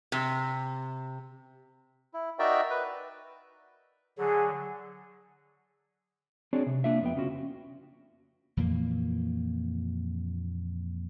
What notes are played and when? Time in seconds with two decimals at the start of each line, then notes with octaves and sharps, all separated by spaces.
0.12 C3
2.14 E4
2.39 D#4 F#4 A#4 D5 E5 G5
2.71 B4
4.18 D3 F#3 G#4
6.53 C4 D4 F#4 G#4 C#5 D5
6.66 C3
6.84 A#3 D4 F4 E5
7.01 F2 B3 G5
7.16 C#2 C#4 F4 F#4
8.57 F2 A#2 E3 A#3